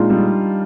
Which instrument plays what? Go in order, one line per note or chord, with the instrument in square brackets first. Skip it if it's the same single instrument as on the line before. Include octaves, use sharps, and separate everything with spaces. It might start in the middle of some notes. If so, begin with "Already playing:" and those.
Already playing: [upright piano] A#2 G#3 [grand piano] D4 D#4 F4
[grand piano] G3